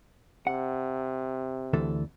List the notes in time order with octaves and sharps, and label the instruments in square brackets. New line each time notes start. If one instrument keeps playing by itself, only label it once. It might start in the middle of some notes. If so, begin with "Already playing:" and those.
[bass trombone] C3 [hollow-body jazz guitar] F#5
[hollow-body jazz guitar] D2 E3 A4